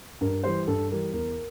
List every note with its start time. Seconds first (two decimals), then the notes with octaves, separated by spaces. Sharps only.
0.21 G2 A#4
0.44 E3 G3 C5
0.67 G2 A4
0.91 E3 G3 A#4
1.13 E2 A#4